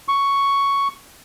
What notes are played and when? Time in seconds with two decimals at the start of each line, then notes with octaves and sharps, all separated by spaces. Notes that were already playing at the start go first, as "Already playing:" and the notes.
0.08 C#6